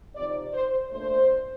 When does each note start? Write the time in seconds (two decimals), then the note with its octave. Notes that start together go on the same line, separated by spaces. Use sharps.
0.15 C3 F3 C4 D#4 D5
0.52 C5
0.90 A#2 A3 D4 C5